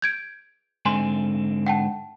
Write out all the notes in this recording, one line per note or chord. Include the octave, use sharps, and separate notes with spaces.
G6 G#6 D7
G#2 D3 C4 G#5 C6
F#5 G5 A5